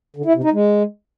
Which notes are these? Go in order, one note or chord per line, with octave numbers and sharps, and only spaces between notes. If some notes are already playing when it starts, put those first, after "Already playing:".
D3
E4
C3
D#4
G#3